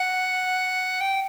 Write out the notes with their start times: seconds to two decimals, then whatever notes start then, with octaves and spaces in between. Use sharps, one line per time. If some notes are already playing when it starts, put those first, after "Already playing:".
Already playing: F#5
1.01 G5